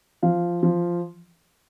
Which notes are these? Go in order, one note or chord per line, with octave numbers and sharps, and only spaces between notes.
F3 F5
F3